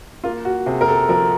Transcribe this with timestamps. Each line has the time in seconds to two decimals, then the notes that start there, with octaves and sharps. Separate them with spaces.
0.24 A#3 F4
0.45 F#4
0.66 C3 G#4
0.81 A#4
0.88 A4
1.09 F3 A#4